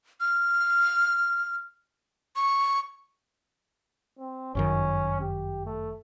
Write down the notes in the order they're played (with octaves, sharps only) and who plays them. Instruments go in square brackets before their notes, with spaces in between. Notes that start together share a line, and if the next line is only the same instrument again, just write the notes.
[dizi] F6
C#6
[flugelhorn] C4
[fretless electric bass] G1 F#2 D#3 [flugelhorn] C#4
[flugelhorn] G4
A3